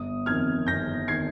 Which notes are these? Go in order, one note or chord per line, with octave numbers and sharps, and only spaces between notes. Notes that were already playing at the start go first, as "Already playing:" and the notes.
Already playing: G1 D#6
F2 D#3 F6 G#6
G1 G6 A#6
D#3 G#6 C7